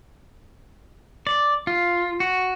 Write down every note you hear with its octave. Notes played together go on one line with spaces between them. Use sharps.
D5
F4
F#4